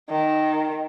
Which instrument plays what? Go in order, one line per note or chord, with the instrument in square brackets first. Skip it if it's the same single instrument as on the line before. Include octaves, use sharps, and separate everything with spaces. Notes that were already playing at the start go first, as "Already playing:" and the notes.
[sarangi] D#3